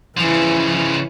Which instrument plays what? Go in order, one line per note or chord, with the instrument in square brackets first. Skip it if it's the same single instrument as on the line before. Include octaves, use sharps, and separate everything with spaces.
[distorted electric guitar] C#3 F3 [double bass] E3